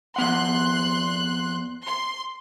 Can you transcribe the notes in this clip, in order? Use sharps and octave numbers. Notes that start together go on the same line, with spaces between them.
F2 B3 F#5 C6 F#6
C6